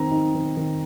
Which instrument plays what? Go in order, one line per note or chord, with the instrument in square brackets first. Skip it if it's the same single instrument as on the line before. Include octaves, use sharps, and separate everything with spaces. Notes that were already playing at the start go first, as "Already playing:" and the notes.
Already playing: [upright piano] D#3 C4 A#5
D#4
D#3
D#3